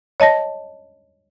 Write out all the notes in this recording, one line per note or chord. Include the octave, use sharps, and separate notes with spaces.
C#5 D#5 A5 A#6